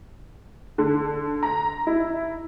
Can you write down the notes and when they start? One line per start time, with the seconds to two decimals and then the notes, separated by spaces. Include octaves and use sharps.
0.78 D3
1.43 A#5
1.87 E4